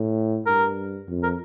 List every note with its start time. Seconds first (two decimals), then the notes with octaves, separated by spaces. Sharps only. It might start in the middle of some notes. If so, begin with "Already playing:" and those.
Already playing: A2
0.46 G2 A#4
1.08 F2
1.23 A#4